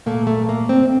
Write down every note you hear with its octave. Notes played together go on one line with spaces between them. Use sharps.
A#2 A3 A#3
A3
A#3
C4